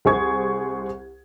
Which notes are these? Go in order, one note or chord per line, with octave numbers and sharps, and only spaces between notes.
C2 G#4 C5 C#6 G#6